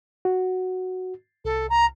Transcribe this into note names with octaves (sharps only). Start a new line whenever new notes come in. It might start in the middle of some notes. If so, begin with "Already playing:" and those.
F#4
C2 A4
A#5